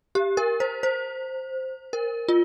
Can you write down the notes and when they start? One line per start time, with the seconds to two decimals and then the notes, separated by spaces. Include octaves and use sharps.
0.15 G4
0.37 A#4
0.60 C5
0.83 C5
1.93 A#4
2.28 F4